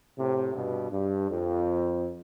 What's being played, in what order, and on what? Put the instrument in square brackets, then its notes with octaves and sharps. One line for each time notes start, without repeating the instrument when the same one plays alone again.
[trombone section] A2 C3
G2 B2
G2
F2